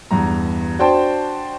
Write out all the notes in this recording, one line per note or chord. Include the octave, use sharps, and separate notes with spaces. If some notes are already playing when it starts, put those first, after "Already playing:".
E2 G2 A#5
D4 F#4 C5 G5 A5